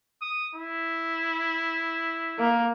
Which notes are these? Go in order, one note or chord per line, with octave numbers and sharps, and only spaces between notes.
D#6
E4
A#3